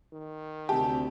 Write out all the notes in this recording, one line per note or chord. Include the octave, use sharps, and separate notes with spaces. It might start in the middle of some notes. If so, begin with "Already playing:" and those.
D#3
D2 C3 G4 A5